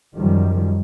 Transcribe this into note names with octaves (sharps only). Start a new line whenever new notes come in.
F#2 D#3 F3 G3